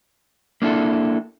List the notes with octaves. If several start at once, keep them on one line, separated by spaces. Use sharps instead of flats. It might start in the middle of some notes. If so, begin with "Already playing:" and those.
A#3 D4 E4 A4